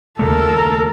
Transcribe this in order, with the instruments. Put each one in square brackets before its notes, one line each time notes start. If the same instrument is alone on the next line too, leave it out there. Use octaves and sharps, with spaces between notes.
[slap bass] D#2 C#3 A3 [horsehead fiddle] A4 A#4